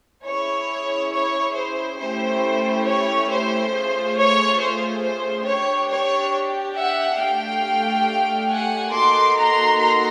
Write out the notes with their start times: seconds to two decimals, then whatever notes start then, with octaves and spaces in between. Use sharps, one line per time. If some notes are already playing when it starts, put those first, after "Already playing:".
0.24 C#4 E4 G#4 C#5
1.11 C#5
1.55 C5
1.98 A3 C#4 E4 G4 C5
2.85 C#5
3.28 C5
3.71 A3 C#4 F4 G#4
4.15 C#5
4.58 C5
5.02 C5
5.45 D4 G4 C#5
5.89 C#5
6.75 E5 F#5
7.18 A3 D4 G4 F5 G5
8.49 F#5 G#5
8.92 A#3 D#4 F#4 A4 C6 D6
9.36 A#5 C6
9.79 A#5 C6